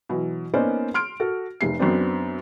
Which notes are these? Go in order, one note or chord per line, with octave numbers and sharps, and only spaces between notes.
B2 E3 F#3
A#3 B3 C#4 D#4 C5 D5
C6 F6 D7
F#4 A4
F1 C3 C7
F#2 B3 C4 D4